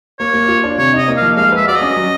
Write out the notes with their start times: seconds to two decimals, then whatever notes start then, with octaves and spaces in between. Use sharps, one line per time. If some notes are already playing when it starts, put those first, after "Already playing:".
0.19 A#3 C#5
0.34 A#3
0.48 F4
0.64 D4
0.78 C3 C#5
0.93 D#4 D#5
1.08 A#3
1.17 F3 F5
1.37 G#3 F5
1.52 B4 E5
1.67 F#4 D5
1.76 C#4 D#5
1.96 F#3